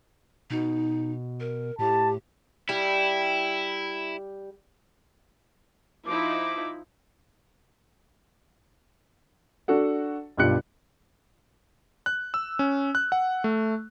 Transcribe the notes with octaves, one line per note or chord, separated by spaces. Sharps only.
B2 D#4
A#4
A2 G4 A5
G3 E4 G4
F3 D#4 E4 D6
D4 F#4 A4 F#5
B1 G2 F4 G4 F#6 C#7
F#6
E6
C#4
F#6
F#5
A3